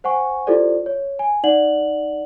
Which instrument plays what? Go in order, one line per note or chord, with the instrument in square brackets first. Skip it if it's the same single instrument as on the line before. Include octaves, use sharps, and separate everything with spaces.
[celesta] C5 F#5 G#5 C#6
E4 F4 G4 A4 C5 D5
C#5
G#5
D#4 D5 F#5 F#7